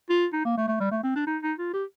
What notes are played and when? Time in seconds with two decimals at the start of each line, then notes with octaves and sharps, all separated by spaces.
0.10 F4
0.33 D#4
0.45 A#3
0.57 A3
0.68 A3
0.80 G3
0.91 A3
1.03 C4
1.15 D4
1.27 D#4
1.43 D#4
1.58 F4
1.74 G4